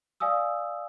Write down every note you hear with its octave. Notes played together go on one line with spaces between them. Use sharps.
D5 F5 G#5 D#6 E6